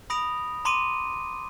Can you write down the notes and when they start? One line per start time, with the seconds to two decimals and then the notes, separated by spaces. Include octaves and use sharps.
0.10 B5 D#6 A#6 D7 F7
0.65 A#5 C6 D6 D7 D#7